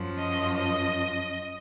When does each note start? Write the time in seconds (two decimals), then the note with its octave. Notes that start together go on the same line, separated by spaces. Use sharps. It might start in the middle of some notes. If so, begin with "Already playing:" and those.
Already playing: F#2 F3
0.19 D#5
0.56 D#5